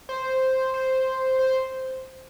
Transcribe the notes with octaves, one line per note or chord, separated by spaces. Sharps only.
C5
C5
C5